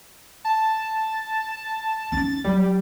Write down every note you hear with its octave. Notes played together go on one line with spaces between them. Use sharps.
A5
C#4 D#4 A6
F#3 G3